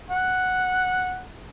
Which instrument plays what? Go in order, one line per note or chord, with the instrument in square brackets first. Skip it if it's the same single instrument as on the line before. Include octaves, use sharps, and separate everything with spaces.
[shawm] F#5